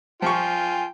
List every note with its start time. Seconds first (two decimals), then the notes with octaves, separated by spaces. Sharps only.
0.22 F3 F4 G5 G#5 C#6